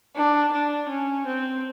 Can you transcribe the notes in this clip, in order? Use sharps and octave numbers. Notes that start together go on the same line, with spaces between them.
D4
D4
C#4
C4